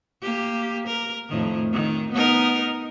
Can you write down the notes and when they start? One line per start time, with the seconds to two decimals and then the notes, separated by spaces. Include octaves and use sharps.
0.22 A#3 G4
0.87 A#4
1.29 F2 A2 D#3
1.73 D#3
2.12 B3 D#4 A#4